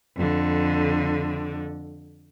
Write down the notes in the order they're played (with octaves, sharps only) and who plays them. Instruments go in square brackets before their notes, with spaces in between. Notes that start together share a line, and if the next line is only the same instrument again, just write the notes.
[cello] F2 D3